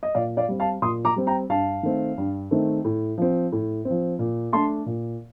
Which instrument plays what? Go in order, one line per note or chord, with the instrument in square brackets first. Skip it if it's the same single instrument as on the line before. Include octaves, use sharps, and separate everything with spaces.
[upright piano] D#5
A#2 D5 F5
D5 F5
G3 C4
F5 A5
A#2 C6 D#6
A#5 D6
G3 C4
G5 A#5
G2 F5 A5
D#3 A3 C4
G2
D#3 A3 C4
A2
F3 C4
A2
F3 C4
A#2
A3 D4 A5 C6
A#2